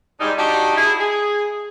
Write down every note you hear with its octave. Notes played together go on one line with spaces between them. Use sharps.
G#2 G3 D4 D#4
D4 D#4 F#4 G4
E4 G#4
G#4